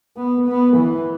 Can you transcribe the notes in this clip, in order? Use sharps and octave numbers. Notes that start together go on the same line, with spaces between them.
B3
B3
E3